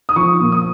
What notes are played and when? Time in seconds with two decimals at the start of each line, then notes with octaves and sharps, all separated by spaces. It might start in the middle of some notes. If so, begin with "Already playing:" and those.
0.09 D#6
0.16 F3 C#6
0.40 A#2
0.52 D#6